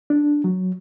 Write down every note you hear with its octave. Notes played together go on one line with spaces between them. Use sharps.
D4
F#3